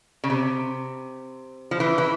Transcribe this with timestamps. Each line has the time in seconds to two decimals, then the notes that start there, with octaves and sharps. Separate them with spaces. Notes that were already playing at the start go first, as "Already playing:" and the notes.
0.24 C#3
0.30 C3
1.71 F3
1.80 E3
1.98 E3